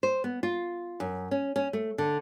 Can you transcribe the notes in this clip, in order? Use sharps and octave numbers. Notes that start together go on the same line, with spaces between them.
C5
B3
F4
F#2
C#4
C#4
A3
D3